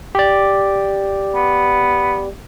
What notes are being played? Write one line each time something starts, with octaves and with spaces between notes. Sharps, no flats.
G4 D5
B3